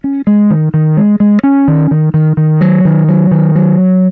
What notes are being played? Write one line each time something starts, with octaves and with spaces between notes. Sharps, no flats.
C#4
G#3
D#3
D#3
G#3
G#3
C#4
D#3
D#3
D#3
D#3
F#3
D#3
F#3
D#3
F#3